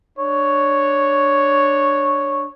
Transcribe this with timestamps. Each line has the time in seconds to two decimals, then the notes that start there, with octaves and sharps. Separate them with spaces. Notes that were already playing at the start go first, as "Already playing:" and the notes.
0.18 D4 C#5